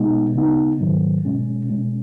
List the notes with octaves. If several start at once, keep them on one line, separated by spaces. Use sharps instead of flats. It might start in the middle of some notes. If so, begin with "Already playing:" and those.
Already playing: B2 G#3 B3 D#4
C#3 B3 D#4
G#2 D#3 F#3
B2 G#3 C#4
B2 G#3 C#4